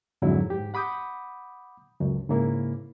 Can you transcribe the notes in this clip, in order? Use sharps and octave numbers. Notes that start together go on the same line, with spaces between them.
F2 G#2 D3 F#3 E4
G#2 G4
F#5 B5 D6 D#6 G6
C#2 F#2
G#2 C#3 A#3 E4